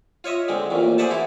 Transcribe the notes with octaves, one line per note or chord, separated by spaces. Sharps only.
F4 C#5 D#5 E5
D3 G#3 C4
A1 F2 A#2
G#4 C5 D5 E5 F#5 A5
E3 E4 F#4